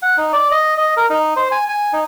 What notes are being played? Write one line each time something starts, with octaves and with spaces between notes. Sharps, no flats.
F#5
D#4
D5
D#5
D#5
A#4
D#4
C5
G#5
G#5
D#4